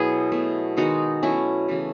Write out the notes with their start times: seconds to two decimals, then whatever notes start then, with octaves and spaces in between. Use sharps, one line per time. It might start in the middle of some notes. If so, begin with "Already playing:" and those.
Already playing: B2 F#3 B3 E4 G#4
0.32 B2 A3
0.77 D#3 G#3 B3 D#4 F#4
1.23 B2 F#3 A3 C#4 E4
1.68 C#3 E3 A3